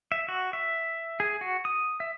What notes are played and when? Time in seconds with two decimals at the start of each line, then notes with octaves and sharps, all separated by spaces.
0.12 E5
0.28 F#4
0.53 E5
1.20 G#4
1.41 F#4
1.65 D#6
2.00 E5